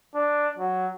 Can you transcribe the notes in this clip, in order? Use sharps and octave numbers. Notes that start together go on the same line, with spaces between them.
D4
F#3